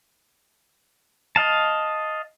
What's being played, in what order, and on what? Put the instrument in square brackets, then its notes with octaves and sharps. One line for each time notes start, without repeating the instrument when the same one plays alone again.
[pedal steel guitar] D#5 F5 A5